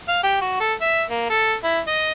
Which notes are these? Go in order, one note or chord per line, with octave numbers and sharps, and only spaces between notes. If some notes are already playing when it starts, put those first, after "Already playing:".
F5
G4
F#4
A4
E5
A#3
A4
E4
D#5